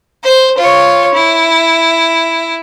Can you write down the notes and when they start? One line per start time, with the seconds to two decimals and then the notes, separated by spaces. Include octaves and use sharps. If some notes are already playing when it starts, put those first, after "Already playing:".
0.24 C5
0.58 F4 C#5
1.14 E4